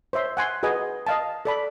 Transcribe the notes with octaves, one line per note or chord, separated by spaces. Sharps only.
C5 C#5 E5 C6
F#5 G#5 C6
F#4 G#4 B4 D#5 G#5
D#5 F5 A5
A4 D5 B5